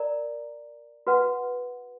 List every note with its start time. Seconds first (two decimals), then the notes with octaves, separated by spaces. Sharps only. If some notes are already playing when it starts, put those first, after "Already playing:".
Already playing: A#4 D5 A#5
1.07 F#4 B4 F#5